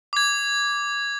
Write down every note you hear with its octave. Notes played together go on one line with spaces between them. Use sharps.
D6 G#6